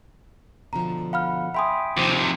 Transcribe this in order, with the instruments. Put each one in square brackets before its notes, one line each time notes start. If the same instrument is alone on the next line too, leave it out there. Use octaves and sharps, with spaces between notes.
[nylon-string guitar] B2 D3 F3 [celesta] A#5
[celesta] F5 B5 F6 [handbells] F#5
[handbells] E5 G5 G#5 [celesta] B5 C6 D#6
[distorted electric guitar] D#2 C3 [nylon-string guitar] F3 C4 [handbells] D6 C#7